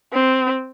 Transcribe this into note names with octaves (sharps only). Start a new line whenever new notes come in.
C4